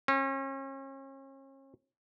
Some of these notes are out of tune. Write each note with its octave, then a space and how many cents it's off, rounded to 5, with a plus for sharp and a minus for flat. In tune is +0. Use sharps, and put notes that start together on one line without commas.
C#4 -40